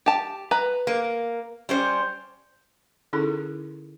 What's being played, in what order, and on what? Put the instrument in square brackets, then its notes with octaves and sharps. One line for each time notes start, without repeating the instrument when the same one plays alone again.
[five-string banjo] G4 A5
B4 A#5
[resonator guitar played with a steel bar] A#3
G3 C#4 C5
[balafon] D3 C#4 D#4 E4 G#4 A4